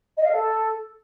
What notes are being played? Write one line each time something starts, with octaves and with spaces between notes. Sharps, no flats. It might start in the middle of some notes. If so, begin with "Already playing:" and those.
D#5
F5
A4